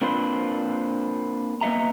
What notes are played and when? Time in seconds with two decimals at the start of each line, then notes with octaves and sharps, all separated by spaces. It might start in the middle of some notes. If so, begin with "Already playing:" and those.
0.02 A#3 C4 D4 F4 B4 C5
1.61 A#3 B3 D#5 E5 A#5